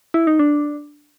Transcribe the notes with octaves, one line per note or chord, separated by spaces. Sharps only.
E4
D#4
D4